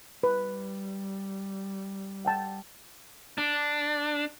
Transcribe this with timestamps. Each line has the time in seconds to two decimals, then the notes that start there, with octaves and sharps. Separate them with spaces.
0.23 G3 B4
2.25 F#5 G5 A5
3.38 D4